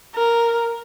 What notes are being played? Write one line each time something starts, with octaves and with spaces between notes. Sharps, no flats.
A#4